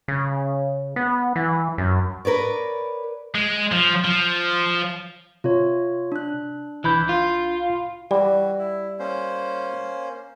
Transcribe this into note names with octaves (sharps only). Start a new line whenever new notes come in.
C#3
B3
E3
F#2
A#4 B4 C#5 D5
G#3
F3
F3
C3 F4 C#5
D4 F#6
C2 E3 B5 G6
F4
E3 G3 F#4 D5
E4
A#3 C#4 C5